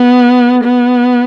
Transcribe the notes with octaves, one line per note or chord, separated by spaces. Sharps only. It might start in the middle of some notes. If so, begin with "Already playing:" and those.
Already playing: B3
B3